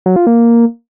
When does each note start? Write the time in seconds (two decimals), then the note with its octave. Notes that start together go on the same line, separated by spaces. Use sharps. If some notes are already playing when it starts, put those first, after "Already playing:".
0.06 F#3
0.16 F4
0.27 A#3